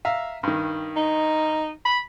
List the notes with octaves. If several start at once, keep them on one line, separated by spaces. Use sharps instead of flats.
E5 F5 A#5
G2 D#3
D#4
B5